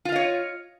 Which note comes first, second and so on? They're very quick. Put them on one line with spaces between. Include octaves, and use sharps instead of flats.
F4 F5 D#5 C#5